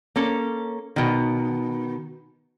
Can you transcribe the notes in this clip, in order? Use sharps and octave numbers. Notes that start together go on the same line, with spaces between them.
A#3 C#4 A4
B2 D#3